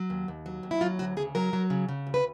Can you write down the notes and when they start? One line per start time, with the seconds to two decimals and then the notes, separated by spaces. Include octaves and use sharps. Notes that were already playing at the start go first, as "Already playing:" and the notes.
Already playing: F#3
0.10 D#2
0.28 D#2
0.46 F#3
0.63 D#2
0.71 E4
0.81 F#3 F4
0.99 D2 F#4
1.17 C#3 G#4
1.35 F#3 A#4
1.53 F#3
1.70 C#3
1.89 C#3
2.07 D2
2.14 B4